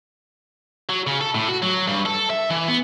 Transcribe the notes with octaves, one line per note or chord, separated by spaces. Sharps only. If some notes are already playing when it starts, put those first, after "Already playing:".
F#3
C#3
A4
A2
F#4
F#3
G2
A4
E5
E3
B3